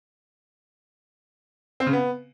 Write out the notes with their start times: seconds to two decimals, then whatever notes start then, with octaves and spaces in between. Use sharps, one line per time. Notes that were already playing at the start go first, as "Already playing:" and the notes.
1.80 C4
1.86 C#3
1.93 B3